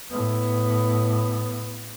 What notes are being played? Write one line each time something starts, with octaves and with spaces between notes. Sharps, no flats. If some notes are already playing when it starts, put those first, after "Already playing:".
A2 B3